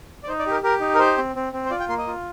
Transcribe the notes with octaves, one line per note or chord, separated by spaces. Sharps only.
D5
D#4 C5
D5
G4 A#4
G4 A#4
D#4
A#4
G4 C5
C4
C4
C4
C5
F4 D5
G5
A#3 C6
D#5
F4